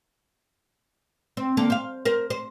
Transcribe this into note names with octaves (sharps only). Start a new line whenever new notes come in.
C4
D3 A#3 A4
C5 F5
A#4 C5
C5